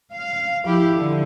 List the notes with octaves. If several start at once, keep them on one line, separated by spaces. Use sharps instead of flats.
F5
F3 E4 G4
D3